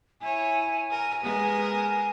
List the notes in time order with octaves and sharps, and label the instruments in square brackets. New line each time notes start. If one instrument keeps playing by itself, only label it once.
[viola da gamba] E4 C#5 [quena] G#5
[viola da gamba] A#4
G#3 B3 A#4
[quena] G#5